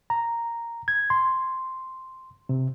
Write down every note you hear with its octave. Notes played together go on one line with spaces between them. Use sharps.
A#5
G#6
C6
C3